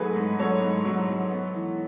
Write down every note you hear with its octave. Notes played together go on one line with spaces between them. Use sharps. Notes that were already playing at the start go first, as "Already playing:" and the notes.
Already playing: G#2 F#3 A3 G#4 B4
G#2
F#3 A4 C#5
G#2
F#3
F#3
B3
E3